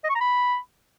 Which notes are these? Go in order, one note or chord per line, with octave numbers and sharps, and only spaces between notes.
D#5
C#6
A#5
B5